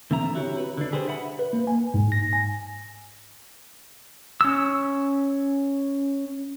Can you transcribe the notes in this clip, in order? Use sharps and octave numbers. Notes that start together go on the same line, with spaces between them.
D3 E3 C4 E5 A#5
E4 F#4 G4 C#5
B4
D3 D4
D3 G4 G#4 B4 C5
E5 F#5 B5
B4
A#3
G#5
G#2
A#6
G#5
C#4 E6